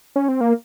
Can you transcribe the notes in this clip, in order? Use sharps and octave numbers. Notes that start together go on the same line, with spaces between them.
C#4
C4
A#3